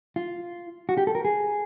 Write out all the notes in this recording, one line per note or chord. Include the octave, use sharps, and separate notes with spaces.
F4
F#4
G4
A4
A#4
G#4